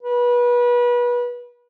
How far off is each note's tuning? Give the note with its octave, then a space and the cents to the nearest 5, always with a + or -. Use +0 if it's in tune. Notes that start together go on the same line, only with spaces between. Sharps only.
B4 -30